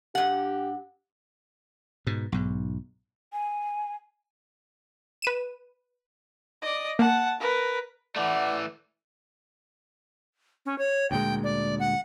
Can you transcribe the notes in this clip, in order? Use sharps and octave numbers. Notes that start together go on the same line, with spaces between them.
G2 G4 F#5
G#2 B2
B1 G#2
G#5
B4 D#7 E7
D5 D#5
A#3 F#5 A5
A#4 B4
E3 A3 D5 F#5
C#4
C#5
D2 A#2 G#3 G5
D5
F#5